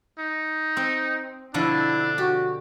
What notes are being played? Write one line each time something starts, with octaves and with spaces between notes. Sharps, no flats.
D#4
C4
B2 D3 F3 D4 E4
F#4 G4